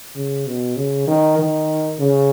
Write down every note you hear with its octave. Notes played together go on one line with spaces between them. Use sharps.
C#3
B2
C#3
D#3
D#3
C#3